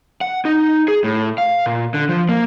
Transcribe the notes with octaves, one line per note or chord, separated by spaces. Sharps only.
F#5
D#4
G#4
A2
F5
A#2
D3
F3
A#3